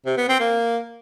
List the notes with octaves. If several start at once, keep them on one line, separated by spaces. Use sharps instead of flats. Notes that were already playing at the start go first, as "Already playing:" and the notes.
C3
B3
C4
A#3